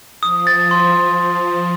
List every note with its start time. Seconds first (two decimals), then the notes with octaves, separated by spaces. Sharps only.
0.23 F3 D#6
0.47 A6
0.71 C6